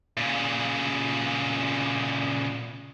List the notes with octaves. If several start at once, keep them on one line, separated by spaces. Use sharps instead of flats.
A#2 C#3